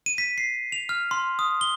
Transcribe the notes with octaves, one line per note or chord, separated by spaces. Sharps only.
D#7
B6
C7
F7
F6
C6
D#6
G7